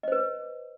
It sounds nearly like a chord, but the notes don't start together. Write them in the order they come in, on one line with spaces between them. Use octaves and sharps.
D#5 C5 B4